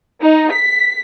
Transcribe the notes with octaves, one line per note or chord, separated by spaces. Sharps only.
D#4
B6